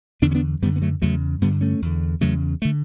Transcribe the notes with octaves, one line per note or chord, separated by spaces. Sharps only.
E2 D3 B3 D4
C#4
B3 D4
F#2 D3 G3 B3
B3
F#3 A3
E2 C#3 F#3 A3
G2 D3 G3 B3
A3 C#4
E2 D3
E2 C#3 F#3 A3
A3
D3